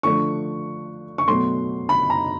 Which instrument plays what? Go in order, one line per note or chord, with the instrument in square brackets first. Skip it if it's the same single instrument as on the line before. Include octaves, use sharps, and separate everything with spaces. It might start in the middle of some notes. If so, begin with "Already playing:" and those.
[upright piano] D3 F3 A3 D4 C#6
C#6
B2 F#3 A3 C6
B5
A#5